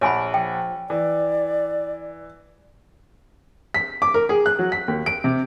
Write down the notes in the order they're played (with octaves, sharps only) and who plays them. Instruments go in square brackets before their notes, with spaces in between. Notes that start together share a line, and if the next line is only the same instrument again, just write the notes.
[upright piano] A#1 F#5 [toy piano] C#5 G#5 B5
[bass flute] F3 [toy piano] G5
[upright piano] E3 [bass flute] D5
[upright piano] B6
D6
A#4
G#4
F#6
F#3
B6
D#2
D7
C3